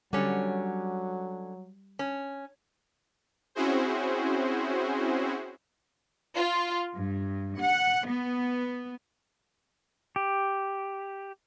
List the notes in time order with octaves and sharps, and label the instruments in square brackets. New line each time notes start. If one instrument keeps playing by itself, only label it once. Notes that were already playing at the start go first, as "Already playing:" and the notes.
[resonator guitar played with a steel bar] D3 C#4 [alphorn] F#3 [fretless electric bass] G3
[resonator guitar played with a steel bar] C#4
[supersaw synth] C4 C#4 E4 F#4 G#4 C5
[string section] F4
G2
F#5
B3
[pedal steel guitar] G4